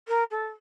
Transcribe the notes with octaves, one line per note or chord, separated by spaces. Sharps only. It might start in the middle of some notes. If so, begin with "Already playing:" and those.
A#4
A4